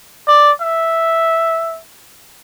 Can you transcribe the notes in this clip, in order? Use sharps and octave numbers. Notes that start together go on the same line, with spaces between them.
D5
E5